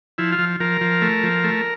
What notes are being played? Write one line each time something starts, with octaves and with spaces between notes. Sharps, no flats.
F3 E4
F4
F3
F3 A#4
F3
A3
F3
A3